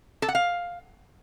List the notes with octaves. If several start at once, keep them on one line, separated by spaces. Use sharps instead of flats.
A4
F#5
F5